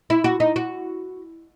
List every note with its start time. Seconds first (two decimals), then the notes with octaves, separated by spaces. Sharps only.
0.10 E4
0.24 F#4
0.40 D#4
0.56 F#4